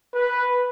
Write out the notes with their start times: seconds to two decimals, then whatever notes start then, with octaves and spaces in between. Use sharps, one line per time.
0.14 B4